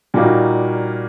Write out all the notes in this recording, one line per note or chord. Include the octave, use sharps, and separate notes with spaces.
A#2 G3 A#3 D#4 F#4